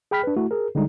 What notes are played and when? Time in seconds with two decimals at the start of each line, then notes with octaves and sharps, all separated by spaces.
0.11 G#4 G5 B5 F6 B6
0.24 D4 B4
0.37 A3 E4 F#4
0.51 G#4 A#4
0.75 D3 G3 G#3 D#4